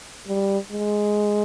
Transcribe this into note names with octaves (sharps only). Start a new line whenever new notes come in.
G3
G#3